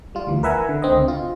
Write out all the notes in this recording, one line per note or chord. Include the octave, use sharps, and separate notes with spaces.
G3 F4
D2 E3
A#4 B4 E5 F#5 G#5 A#5
D3
C#2 D3 C4 D#5
F4